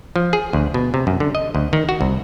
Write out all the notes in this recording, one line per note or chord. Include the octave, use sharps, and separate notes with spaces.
F3
G#4
D2
B2
C3
F#2
D3
D#5
D2
D#3
F#4
C2